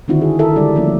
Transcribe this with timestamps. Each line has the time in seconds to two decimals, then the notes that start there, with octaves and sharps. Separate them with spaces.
0.08 D3 D#3 C4 D4 E4 F#4
0.22 G#4
0.39 E4 A4 A#4 E5
0.56 D3 G3 G#3 D4 D5
0.76 F3 G3 A3 A#3 C#4 D4